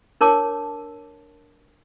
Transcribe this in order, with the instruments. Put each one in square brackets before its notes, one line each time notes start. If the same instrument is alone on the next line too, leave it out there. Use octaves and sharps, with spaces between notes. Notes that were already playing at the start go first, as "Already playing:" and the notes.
[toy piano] D4 A#4 C#5 A5 D6